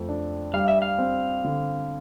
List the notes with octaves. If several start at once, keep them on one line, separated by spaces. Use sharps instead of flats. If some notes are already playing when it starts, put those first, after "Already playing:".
Already playing: F2 A3
D4
G3 F5
E5
F5
C4
D3